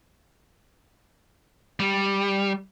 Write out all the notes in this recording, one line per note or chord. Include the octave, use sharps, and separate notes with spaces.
G3